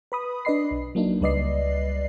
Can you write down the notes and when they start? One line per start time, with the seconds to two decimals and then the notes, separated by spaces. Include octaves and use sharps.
0.12 B4 B5 D#6
0.45 D4 B4 D5 D#5 B5 C7
0.71 B1
0.95 F#3 A#3 D4 D#4
1.21 C#2 G3 B4 D5 D#5 C7